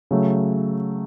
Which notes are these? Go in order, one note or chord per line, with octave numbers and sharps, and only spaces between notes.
C#3 F#3 A3